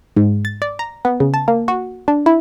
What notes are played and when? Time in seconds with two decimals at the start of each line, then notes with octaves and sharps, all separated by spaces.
0.16 G#2
0.45 A6
0.62 D5
0.79 A#5
1.05 B3
1.20 C#3
1.34 A5
1.48 A#3
1.68 F#4
2.08 D4
2.26 E4